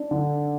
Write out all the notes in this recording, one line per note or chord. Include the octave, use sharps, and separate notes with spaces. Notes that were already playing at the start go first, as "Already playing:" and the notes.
Already playing: D4
D3